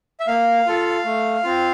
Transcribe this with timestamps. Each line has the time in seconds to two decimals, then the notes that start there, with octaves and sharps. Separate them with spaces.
0.20 E5
0.27 A#3 F5
0.66 F4 A4
1.05 A3
1.43 C4 F4